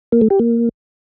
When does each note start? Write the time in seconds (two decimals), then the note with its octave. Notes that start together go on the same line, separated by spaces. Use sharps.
0.12 A#3
0.21 A3
0.30 G4
0.39 A#3